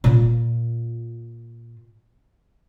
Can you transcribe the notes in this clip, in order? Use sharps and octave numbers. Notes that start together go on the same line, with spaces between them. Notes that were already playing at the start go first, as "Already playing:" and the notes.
A#2 F4